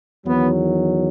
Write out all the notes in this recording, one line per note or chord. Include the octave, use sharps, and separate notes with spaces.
E2 D#3 F#3 B3